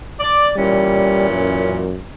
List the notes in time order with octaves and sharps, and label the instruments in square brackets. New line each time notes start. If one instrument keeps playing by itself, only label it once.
[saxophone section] D5
[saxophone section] A#2 E3 C#4 [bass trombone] G3
[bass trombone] F#2